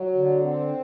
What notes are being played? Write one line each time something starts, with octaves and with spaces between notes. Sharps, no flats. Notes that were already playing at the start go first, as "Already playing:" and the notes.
Already playing: F#3
D3
C4